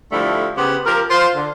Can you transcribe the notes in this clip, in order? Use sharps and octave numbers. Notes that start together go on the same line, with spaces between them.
D3 F3 G3 A3 E4
C#3 B3 G4 C5 F#5
F3 G4 A#4
F4 C5
D3